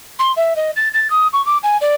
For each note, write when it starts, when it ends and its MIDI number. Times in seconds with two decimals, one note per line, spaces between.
0.19 0.32 84
0.36 0.53 76
0.56 0.71 75
0.76 0.89 93
0.94 1.08 93
1.10 1.27 87
1.33 1.44 85
1.46 1.58 86
1.63 1.77 80
1.81 1.95 74